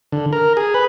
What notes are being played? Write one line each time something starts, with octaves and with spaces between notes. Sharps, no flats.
D3
A#4
G#4
B4